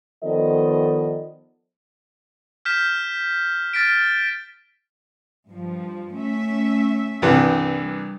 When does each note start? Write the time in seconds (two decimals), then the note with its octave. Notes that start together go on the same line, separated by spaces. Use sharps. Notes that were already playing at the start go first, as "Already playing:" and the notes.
0.24 D#3 F3 B3 A4 D5 D#5
2.65 F6 G6 B6 E7
3.73 F6 A6 B6 D7
5.48 G2 F3
6.17 A3 C#4 E5
7.22 C2 G2 E3
7.79 G3